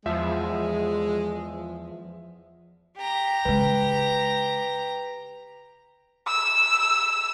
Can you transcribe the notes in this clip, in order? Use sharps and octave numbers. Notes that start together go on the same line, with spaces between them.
E2 F3 G#3 E5
G4 A#5
C#3 G#3 B4
E6